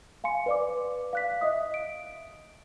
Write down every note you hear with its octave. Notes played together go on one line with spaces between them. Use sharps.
F5 G#5 C6 C#7
B4 D5 D6
F5 F#6 B6
D#5 E5 D#6
D7